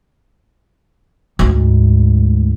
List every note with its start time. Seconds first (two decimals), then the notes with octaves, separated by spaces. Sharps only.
1.39 D2 G#2